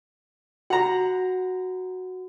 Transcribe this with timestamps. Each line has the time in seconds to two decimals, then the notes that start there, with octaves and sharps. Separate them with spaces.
0.70 F#4 F#5 A#5